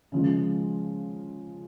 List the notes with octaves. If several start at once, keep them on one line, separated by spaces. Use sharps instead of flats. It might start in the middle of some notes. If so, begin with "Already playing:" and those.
C#3 F3 G#3